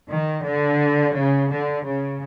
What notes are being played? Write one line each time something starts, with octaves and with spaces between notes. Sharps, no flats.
D#3
D3
C#3
D3
C#3